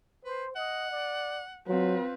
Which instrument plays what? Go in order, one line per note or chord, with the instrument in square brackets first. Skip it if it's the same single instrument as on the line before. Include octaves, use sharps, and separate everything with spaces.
[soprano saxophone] B4 [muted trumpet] C5
[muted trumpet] D#5 [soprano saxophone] F#5
[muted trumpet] D5
[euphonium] F#3 [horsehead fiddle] C4 B4 [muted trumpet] F4